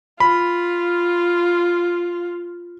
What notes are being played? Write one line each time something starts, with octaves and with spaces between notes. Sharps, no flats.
F4 B5